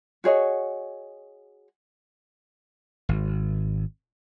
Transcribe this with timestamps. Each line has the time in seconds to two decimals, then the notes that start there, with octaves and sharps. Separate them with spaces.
0.24 F#4 G#4 C#5 D#5
3.09 G#1